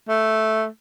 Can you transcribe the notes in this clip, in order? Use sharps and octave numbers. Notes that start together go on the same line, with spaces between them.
A3